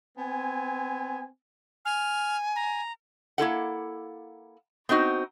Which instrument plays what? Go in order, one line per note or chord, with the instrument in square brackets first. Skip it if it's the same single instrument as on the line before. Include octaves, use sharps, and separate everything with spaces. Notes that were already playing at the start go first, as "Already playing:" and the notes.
[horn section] B3 C4 G#5
[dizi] G#5 [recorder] F6
[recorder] A#5
[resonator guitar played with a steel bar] A#3 E4 A4 F#5
B3 C4 D#4 F#4